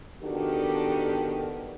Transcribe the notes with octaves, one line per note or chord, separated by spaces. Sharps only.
D#3 B3 D4 F#4 G4 A4